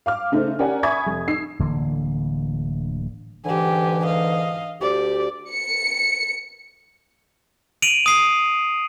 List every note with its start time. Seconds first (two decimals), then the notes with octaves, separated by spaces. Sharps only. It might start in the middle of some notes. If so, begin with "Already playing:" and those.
0.06 F5 D6 F6
0.32 C#3 A3 D#4 C5
0.59 C#4 G4 A#4 D5 F#5 G#5
0.83 E5 G#5 B5 C#6 D#6 G#6
1.06 F1
1.28 D#4 E6 C7
1.59 D1 D3 E3 A#3
3.45 G#2 D3 E3 G4 G#5
4.05 D#5 F5
4.82 D2 G4 D5
5.50 C#7
7.82 D7 D#7 F7 F#7
8.06 D#6 C7